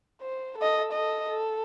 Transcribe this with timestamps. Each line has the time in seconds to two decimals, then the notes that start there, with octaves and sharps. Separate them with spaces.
0.21 C5
0.58 A4 D#5
0.92 A4 D#5
1.29 A4